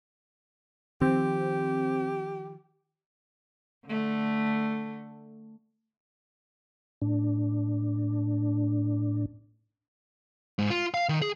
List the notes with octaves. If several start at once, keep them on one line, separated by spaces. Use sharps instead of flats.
D#3 F3 C4 G4
D3 A3
A2 D4
G#2
F4
F5
D#3
G#4